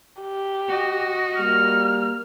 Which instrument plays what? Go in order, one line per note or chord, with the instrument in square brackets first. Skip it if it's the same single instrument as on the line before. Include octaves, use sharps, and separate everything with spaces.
[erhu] G4
[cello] F#4 D#5
[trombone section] G3 A#3 [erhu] F6